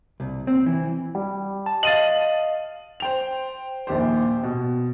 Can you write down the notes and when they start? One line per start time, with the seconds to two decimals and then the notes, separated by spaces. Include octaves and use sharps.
0.20 C2
0.47 C4
0.66 E3
1.15 G3
1.66 A5
1.83 D#5 F5 A6 D#7 F#7
3.00 C5 G5 F7
3.87 A#1 D#2 G4 C5
4.43 B2